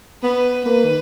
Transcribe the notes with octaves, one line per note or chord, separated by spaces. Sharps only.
B3 B4
A#3 B4
D#3